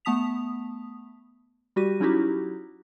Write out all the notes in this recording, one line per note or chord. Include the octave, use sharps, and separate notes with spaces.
A3 B3 A5 D#6 B6 F7
G3 F#4 G4 D#7
F#3 C#4 D#4 E4 F#4 G4